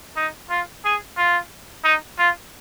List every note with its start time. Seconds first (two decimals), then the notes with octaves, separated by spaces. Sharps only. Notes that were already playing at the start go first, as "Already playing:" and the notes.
0.16 D#4
0.50 F4
0.85 G#4
1.17 F4
1.84 D#4
2.19 F4